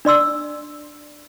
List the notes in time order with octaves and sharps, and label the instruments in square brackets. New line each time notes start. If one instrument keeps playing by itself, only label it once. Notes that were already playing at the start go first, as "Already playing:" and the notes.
[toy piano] D4 D5 C6 E6